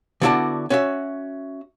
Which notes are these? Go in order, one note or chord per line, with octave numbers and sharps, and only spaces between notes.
D3 B3 E4 F#4 D5 A5
C#4 F#4 E5